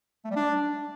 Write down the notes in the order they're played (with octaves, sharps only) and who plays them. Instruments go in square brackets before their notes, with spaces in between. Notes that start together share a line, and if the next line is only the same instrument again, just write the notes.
[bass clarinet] A3
G3
D4